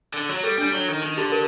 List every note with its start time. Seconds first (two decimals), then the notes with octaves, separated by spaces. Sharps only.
0.14 D3
0.29 F#3
0.43 G3 A4
0.58 G3 D4
0.72 F#3
0.88 D#3
1.02 D#3 D#4
1.17 D3 G4
1.32 A#4